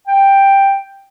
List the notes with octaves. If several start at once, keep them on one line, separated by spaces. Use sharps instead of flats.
G5